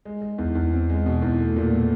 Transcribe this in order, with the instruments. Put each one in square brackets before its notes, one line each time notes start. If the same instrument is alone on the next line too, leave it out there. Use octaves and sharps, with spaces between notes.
[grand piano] G#3
G#3
E2
E2
C4
G#3
B2
E2
A3
A#2
A3